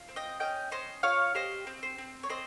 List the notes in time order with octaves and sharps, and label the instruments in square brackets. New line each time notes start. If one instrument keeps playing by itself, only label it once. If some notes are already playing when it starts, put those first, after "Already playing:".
Already playing: [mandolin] F4
C4
D#5 G5
C#4 D#5 G5
C#4 C5 D#5
F4 C#5 F5
G4 C5 D#5
C4
C5
C4
C#5
C4 C5 D#5